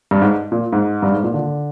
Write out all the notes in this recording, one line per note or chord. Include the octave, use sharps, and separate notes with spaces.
G2
G#2
A#2
G#2
G2
G#2
A#2
D3